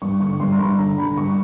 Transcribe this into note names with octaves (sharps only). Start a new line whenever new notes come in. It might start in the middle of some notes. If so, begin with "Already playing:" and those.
G2 C#6
D3 C#6
G2 C6
A#5
G2 B5
D3 A#5
D3 B5
G2 C#6